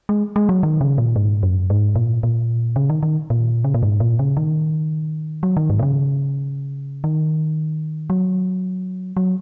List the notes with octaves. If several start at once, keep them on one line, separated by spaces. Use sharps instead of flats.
G#3
G#3
F#3
D#3
C#3
A#2
G#2
F#2
G#2
A#2
A#2
C#3
D#3
D#3
A#2
C#3
A#2
G#2
A#2
C#3
D#3
F#3
D#3
G#2
A#2
C#3
D#3
F#3
F#3